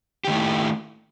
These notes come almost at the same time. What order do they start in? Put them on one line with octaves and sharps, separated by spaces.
G4 D#3 A3 E4